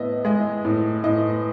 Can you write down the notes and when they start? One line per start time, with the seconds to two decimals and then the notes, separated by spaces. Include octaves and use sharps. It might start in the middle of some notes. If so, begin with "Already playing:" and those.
Already playing: A2 B3 D#5 E5
0.25 G#3 D#5
0.65 A2
1.04 A2 D#5